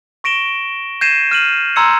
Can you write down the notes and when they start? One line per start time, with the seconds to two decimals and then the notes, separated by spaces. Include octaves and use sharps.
0.24 C#6 A#6 D7 E7 G7
1.01 G6 G#6 A#6 C7 D#7 E7
1.31 F6 D#7 F#7
1.76 A#5 C6 E6 G#6 C#7